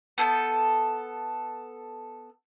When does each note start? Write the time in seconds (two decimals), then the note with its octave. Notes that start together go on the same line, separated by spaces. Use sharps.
0.18 B3 A4 D6 G6